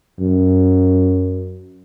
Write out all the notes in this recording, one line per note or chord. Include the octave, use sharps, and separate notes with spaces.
F#2